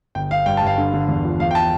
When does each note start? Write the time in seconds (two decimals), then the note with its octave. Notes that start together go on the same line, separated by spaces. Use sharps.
0.15 G1 G5
0.31 G1 F5
0.46 G2 G5
0.57 A5
0.62 G2 F5
0.78 D3
0.94 D3
1.08 E2
1.25 F3
1.40 E2 F5
1.51 G5
1.55 A5